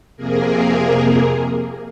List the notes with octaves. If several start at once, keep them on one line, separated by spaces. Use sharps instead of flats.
F2 C3 A#3 G#4 A#4